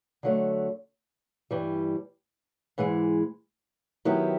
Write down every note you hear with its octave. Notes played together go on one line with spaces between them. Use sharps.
D3 F#3 A3
G2 E3 G3
G#2 E3 G#3
D#3 F#3 B3 E4 G4